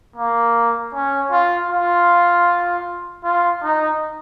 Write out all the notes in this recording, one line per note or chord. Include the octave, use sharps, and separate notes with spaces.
A#3
C#4
F4
F4
F4
D#4